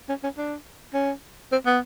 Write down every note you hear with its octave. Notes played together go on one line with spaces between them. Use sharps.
C#4
C#4
D4
C#4
C4
B3